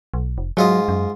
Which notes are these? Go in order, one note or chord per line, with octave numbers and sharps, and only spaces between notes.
B1
F1
G#2 F#3 F4 D#5
F#2